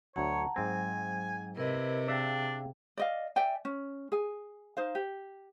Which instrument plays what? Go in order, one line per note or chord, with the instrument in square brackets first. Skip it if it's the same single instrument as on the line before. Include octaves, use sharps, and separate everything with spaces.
[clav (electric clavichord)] D2 F#3 [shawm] C#5 [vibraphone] F#5 A5 A#5
[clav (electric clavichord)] G#2 C4 [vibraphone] F#3 [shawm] G#5
[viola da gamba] C3 [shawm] E4 [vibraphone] A#4 B4 D#5
[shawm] D4 [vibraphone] G#4 F5 G5 [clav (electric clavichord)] D5 E5
[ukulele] D5 D#5 F5
D5 E5 G5 G#5
C#4
G#4 G#5
D#4 C5 F5
G4